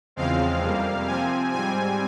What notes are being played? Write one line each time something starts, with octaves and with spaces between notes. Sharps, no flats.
E2 C#3 F3 G#3 C4 F5
F2 C3 G3 A#3
C3 F3 C4 G#5
G#2 G3 C4 G#5